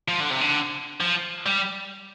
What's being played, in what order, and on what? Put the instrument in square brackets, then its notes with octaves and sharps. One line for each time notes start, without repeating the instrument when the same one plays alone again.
[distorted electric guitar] F3
D3
C3
D3
F3
G3